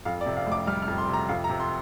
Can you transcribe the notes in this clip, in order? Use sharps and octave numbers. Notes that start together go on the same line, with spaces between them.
F2 F5
D5
C3
F5
F1
D6
G3 F6
F6
F2
C6
C3
A#5
F2 F5
A#5
C3
C6